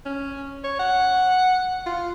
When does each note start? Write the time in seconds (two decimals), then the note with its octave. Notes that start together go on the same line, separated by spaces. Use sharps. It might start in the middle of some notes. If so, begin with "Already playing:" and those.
0.06 C#4
0.64 C#5
0.80 F#5
1.86 F4